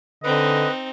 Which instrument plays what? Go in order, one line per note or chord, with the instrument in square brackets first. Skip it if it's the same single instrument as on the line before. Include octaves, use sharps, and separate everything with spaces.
[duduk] D3 [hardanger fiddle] C4 D#4 [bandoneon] B4 [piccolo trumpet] D#5